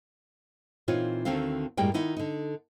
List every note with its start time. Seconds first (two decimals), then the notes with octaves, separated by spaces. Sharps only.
0.88 A#2 E3 C4 D#4 F4 C#5
1.25 D2 D3 D#3 C4 F5
1.77 F#2 A2 G3 G#3 A#3 G5
1.94 D#3 D#4 E4 F#5
2.17 D3 D#4